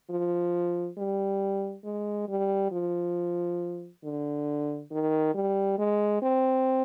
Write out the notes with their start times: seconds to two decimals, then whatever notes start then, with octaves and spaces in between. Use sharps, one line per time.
0.10 F3
0.98 G3
1.85 G#3
2.28 G3
2.72 F3
4.04 D3
4.91 D#3
5.34 G3
5.78 G#3
6.22 C4